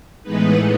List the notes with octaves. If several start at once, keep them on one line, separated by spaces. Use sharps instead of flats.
A2 E3 G#3 B3 D#4 B4